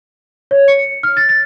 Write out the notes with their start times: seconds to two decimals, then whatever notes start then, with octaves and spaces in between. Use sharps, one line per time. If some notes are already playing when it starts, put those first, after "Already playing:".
0.51 C#5
0.68 C#7
1.03 F6
1.17 A6
1.29 A6